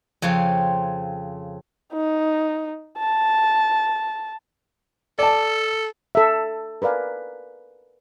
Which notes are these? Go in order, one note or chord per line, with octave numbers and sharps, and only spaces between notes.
F2 C#3 C4 F4 C#5
D#4
A5
A4 D5 A5
A4 E5
A#4 B4 D5 F5 G#5